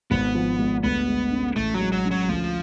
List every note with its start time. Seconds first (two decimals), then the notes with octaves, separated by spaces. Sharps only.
0.11 G#1 B3
0.35 F3
0.59 G#3
0.83 D2 B3
1.08 G#3
1.32 C#4
1.56 A1 A3
1.74 F#3
1.81 G#3
1.92 F#3
2.05 C#4
2.11 F#3
2.29 D2 F3